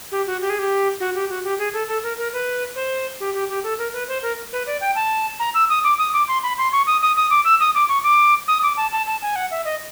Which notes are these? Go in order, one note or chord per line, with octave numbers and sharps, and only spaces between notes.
G4
F#4
G4
G#4
G4
F#4
G4
F#4
G4
G#4
A4
A4
A#4
A#4
B4
C5
G4
G4
G4
A4
A#4
B4
C5
A#4
B4
D5
G5
A5
A#5
E6
D#6
D6
D#6
D6
C6
B5
C6
C#6
D#6
D#6
D#6
D6
E6
D#6
D6
C#6
D6
D#6
D6
A5
A5
A5
G#5
F#5
E5
D#5